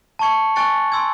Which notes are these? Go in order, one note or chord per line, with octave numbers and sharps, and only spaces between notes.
A5 C#6 G#6 C#7
G#5 C#6 F#6 A6 C#7
G#5 C6 E6 G#6